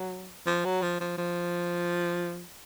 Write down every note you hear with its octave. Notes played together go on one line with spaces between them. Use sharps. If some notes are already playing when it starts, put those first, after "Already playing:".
Already playing: F#3
F3
F#3
F3
F3
F3